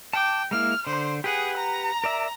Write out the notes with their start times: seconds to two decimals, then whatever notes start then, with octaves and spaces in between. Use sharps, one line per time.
0.13 G5 A5 D6
0.51 G#3 A#3 E4 F6
0.87 D3 C5
1.24 G4 G#4 B4 F#5
1.57 A#5
2.04 A#4 D5 E5